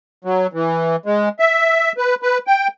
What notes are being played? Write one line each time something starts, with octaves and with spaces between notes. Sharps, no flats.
F#3
E3
G#3
E5
B4
B4
G5